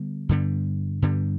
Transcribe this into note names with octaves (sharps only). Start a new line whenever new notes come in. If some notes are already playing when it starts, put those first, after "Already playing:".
Already playing: D3 G3 B3
G2 D3 G3 B3
G2 D3 G3 B3